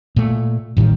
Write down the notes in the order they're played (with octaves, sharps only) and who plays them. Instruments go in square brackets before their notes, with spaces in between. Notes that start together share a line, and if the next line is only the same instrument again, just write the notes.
[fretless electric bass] A#2 A3
A1 A2 D#3 G3